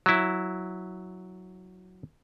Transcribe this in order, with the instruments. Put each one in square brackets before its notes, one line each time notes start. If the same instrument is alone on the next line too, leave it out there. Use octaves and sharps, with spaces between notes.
[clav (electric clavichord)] F#3 E4